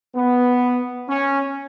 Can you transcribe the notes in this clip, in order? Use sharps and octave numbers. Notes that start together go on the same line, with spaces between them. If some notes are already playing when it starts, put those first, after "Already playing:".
B3
C#4